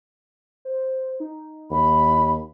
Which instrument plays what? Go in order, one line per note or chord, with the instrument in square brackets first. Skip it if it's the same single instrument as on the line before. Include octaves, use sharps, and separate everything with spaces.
[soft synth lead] C5
D#4
[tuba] D#2 [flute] B5